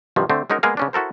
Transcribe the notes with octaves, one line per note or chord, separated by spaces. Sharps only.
G2 C3 D#3 F3 F#3
D3 A3 C4
G#3 C#4 D#4 F#4 A#4
G#3 A#3 B3 G#4 A#4 F5
C#3 C#4 D4
E4 F#4 A4 A#4 C5